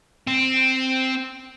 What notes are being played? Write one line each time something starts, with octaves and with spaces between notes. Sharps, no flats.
C4